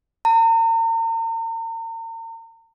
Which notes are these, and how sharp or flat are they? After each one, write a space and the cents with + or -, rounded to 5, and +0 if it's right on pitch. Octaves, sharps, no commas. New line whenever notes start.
A#5 -40